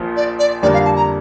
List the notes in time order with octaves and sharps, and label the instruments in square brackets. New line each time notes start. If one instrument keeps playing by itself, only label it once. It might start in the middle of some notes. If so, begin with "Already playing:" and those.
Already playing: [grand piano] A#1 A#2 F3
[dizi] D5
D5
[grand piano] F2 D3 G3 A#3 D4 [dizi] D5
[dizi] F5
A5
A#5